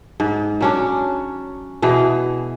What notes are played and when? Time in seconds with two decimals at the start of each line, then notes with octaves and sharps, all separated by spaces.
0.20 G#2
0.61 F#3 C#4 D4
1.82 B2 E3 G#4